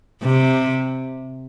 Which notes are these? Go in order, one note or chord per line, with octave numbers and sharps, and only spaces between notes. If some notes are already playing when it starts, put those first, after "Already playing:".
C3